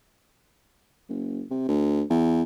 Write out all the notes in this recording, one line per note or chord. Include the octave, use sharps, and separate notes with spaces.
F#1
C3
D2
E2